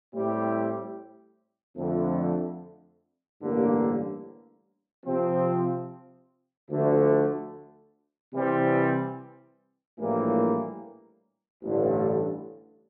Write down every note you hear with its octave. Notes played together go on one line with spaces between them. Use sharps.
A2 G3 C4 E4 G4
F2 D3 A3
A1 G2 D3 G3 A#3
C3 F3 C4
D2 D3 F3 A3
C3 E3 G3 C4
A#1 A2 E3 G3 A#3
A1 G2 D3